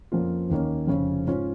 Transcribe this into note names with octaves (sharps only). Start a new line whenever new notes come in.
F2 F3 A#3 C#4 F4
D#2 D#3 A#3 C#4
F1 F2 C#3 F3 C#4
G#2 F3 C#4 F4